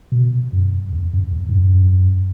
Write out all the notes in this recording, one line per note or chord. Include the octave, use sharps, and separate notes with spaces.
B2
F#2
E2
F#2
E2
G#2
F#2